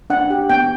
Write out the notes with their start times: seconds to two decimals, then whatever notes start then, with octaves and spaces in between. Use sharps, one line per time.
0.10 D4 F#5
0.30 G4
0.50 B3 G5